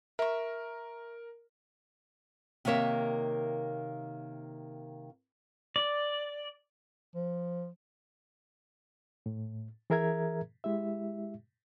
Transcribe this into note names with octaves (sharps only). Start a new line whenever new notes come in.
A#4 E5 C#6
C3 D#3 A#3 C#5 E5
D5
F3
A2
E3 G#4 A#4 E5 A#5 G#6
G#3 E4 G4 E5